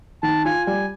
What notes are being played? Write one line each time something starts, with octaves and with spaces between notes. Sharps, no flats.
D#3 A5
F4 G#5
G3 G#5